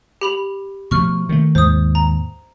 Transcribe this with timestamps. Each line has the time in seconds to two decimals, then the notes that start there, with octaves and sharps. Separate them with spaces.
0.21 G4 B5 F7
0.91 B2 F3 A3 C#6 F6
1.29 D#3 F#3 A3
1.55 D#2 G#2 C5 D#6
1.95 A#5